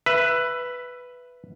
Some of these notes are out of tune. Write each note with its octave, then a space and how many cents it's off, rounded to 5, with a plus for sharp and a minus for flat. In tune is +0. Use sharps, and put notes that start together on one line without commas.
B4 +0 E5 +20